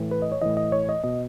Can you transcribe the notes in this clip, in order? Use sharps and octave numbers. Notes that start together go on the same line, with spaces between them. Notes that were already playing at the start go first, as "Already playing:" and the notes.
Already playing: A2 E3
B4
D#5
C#5
A2 E3 D#5
D#5
C#5
D#5
B2 D#5